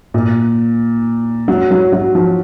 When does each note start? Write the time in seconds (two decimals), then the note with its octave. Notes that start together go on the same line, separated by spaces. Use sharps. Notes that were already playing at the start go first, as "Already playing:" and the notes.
0.14 A#2
1.48 F#3
1.71 F#3
1.92 F#3
2.15 F3